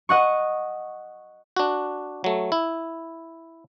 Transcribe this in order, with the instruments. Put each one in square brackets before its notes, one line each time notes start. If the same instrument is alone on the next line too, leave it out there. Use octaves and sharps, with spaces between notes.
[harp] D#5 F#5 C#6
[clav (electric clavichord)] D4 F#4
F#3 A3
E4